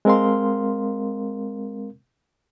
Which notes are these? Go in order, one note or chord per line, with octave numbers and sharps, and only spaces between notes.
G#3 C4 A#4 F5 C6